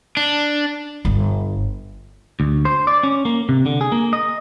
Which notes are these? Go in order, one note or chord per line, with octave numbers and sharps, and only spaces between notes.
D4
G1
D2
C5
D5
C#4
A#3
C3
D3
G#4
A#3
D#5